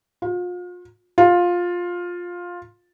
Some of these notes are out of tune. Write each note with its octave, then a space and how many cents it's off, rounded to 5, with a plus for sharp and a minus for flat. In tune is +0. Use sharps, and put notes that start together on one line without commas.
F4 +35
F4 +10